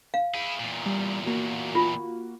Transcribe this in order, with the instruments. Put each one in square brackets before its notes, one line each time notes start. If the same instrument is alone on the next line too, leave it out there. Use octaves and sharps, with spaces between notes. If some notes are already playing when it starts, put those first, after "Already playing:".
[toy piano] F5
[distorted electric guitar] E4 G#4
E2 A#2
[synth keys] G3
A#3 F#4
[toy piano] F4